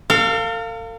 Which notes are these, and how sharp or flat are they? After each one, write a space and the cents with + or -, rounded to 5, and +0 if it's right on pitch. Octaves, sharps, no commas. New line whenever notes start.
A4 +45 F5 +0